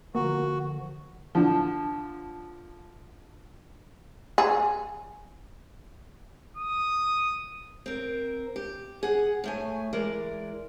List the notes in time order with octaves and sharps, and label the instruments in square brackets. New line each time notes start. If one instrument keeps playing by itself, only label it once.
[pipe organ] D3 F3 [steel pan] A#3 [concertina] F#4
[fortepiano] D3 F3
[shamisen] G#4
[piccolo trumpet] D#6
[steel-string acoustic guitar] C4 A#4
G4
G#4 F#5
A2 A3 G#5
E3 G#3 A#4 D5